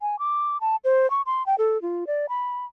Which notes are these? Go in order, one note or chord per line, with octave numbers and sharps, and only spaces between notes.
G#5
D6
A5
C5
C#6
C6
G5
A4
F4
D5
B5